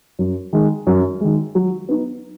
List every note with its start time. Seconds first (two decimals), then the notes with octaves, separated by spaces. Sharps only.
0.19 F#2
0.53 D#3 G#3
0.87 F#2
1.21 D#3 G#3
1.55 F#3
1.89 B3 D#4